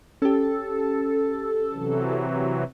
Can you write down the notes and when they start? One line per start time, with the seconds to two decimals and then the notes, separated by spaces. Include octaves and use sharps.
0.22 C#4 G4 A4
1.72 C3 E3 F#3